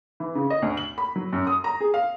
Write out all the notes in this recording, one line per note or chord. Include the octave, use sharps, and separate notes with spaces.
E3
C#3
D#5
D2
F#7
B5
F#3
F#2
D#6
A#5
G#4
F5